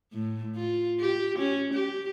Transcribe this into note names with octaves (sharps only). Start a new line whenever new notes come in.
A2
F4
G4
C#4
G4